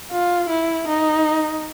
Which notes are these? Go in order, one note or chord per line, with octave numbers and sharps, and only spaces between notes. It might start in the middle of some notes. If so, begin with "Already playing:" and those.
F4
E4
D#4